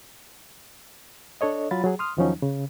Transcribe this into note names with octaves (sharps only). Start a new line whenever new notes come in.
D4 A4 C#5 D#5
F#3 F4 B5 A6
F#3 G#4
C6 D#6 F6
E2 D#3 F3 F#3 C#4 D#4
C#3